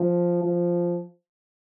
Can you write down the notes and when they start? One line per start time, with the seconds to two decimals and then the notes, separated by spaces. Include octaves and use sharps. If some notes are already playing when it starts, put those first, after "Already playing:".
Already playing: F3
0.43 F3